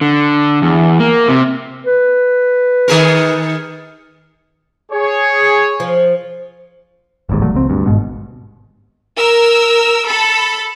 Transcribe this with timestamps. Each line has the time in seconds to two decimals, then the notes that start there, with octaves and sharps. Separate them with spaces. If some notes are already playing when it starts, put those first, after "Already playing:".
0.01 D3
0.62 E2
1.00 A#3
1.28 C3
1.86 B4
2.88 D#3 G#4 A#4
4.92 G#4 C#5
5.80 F3
7.29 D1 G#1 D#2 G#2
7.42 E1 A#2 F#3 A3
7.54 C#2 C4
7.69 D2 G2
7.86 G#1 D2 G#2 B2
9.17 A#4 E6
10.07 A4 B5